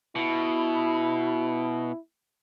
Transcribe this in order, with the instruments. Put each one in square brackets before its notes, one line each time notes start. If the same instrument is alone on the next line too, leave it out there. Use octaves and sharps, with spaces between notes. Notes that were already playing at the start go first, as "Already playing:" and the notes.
[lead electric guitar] B2 [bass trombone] E4